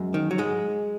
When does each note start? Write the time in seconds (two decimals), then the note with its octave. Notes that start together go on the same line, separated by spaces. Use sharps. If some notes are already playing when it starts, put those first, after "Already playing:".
Already playing: F#2 G#3
0.14 D#3
0.31 F#3
0.38 G#2 G#3